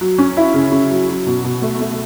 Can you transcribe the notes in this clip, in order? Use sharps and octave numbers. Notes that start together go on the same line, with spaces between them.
F#3
C#4
E4
C#3
C#3
F#3
F#3
B2
B2
A3
A3